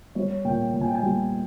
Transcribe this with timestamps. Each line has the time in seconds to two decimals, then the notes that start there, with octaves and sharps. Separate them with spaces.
0.15 G3 C#5
0.44 A#2 G5
0.74 A#2 G5
0.81 G#5
0.88 G5
0.95 G#5
1.02 G3 G5